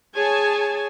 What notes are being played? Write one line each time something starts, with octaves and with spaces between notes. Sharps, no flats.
G#4 C#5 G#5 A5